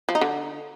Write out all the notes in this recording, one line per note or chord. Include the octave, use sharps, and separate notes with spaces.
F3
D#4
D3